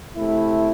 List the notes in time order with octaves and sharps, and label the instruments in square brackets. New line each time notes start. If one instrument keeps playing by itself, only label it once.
[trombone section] C3 A3 E4